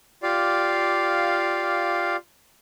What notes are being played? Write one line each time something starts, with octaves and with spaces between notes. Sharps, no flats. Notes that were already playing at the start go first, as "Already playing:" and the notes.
F4 G4 D5 F5